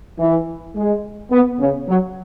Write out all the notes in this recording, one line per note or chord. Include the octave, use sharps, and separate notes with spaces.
E3
G#3
B3
C#3
F#3